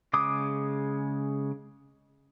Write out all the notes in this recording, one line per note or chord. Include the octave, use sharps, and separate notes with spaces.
C#3 G#3 D6 D#6